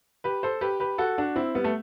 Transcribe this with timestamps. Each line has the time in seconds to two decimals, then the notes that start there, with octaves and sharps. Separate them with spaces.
0.24 G4 B4
0.43 A4 C5
0.61 G4 B4
0.80 G4 B4
0.98 F#4 A4
1.18 D4 F#4
1.36 C4 E4
1.55 G3 B3
1.64 A3